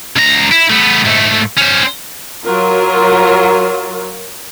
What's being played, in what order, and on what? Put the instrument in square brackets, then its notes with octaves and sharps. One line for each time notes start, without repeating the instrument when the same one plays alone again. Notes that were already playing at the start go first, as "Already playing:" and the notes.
[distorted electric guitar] C#2 A#5
E4
A3 B3
G#2 A3
C#4 C5
[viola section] F#3 F4 A#4